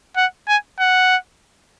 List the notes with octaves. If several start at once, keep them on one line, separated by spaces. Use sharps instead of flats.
F#5
G#5
F#5